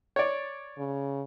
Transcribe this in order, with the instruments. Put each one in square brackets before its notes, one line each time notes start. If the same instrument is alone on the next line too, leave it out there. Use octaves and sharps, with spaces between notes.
[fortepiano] C#5 D5
[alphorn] C#3